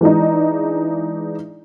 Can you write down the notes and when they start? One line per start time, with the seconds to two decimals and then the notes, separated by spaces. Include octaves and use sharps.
0.01 E3 G#3 D4 D#4